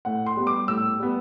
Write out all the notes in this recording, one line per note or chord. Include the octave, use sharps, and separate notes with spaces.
A2 F#5
C6
G3 B3
D6
A2 E6
G3 B3